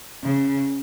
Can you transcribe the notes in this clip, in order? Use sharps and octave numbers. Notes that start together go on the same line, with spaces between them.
C#3